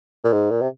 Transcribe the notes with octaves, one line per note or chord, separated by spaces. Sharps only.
A#2
G#2
A#2
C3